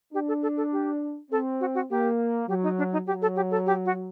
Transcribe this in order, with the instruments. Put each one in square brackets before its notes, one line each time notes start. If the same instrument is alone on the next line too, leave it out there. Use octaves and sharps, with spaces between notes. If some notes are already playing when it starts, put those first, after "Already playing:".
[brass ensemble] D4 [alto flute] G4
[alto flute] A4
A4
A4
G4
[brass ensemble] C4 [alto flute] A4
[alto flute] F#4
F#4
[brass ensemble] A#3 [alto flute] G4
[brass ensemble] F#3 [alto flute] G4
[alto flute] D#4
D4
D#4
[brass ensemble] F#3 [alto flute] G4
[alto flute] A4
G4
A4
G4
F#4